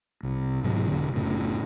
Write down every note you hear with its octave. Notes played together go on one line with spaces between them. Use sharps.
C2
G#1 G#2 B2 F#3
E1 D3
F#1 A2 C#3